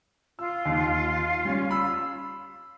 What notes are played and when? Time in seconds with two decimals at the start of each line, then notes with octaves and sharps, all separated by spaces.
0.39 F4 E6
0.65 D#2
1.45 G3 C#4
1.71 B5 E6